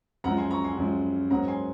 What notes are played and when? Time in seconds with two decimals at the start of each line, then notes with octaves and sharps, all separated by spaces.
0.24 F#2 F3 G#3 F#5 A#5
0.38 G#5 C6
0.51 A#5 C#6
0.64 G#5 C6
0.77 F#2 F3 G#3
1.30 G#2 F#3 A#3 C#4 F#5 A#5
1.48 G#5 C6